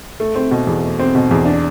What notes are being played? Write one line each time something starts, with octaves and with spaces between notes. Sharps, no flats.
A3
C4
B2
E2
A3
C4
B2
E2
D4